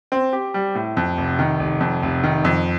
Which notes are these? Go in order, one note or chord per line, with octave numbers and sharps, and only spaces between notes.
C4
G4
G3
A2
F2
F1
D#3
F1
F2
F1
D#3
F2